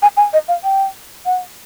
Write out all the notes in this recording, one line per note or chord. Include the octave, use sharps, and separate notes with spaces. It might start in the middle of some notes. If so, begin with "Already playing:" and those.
G#5
G#5
D#5
F5
G5
F#5